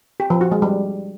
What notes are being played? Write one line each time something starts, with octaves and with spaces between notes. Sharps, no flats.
G4
F3
F#4
G#3
G3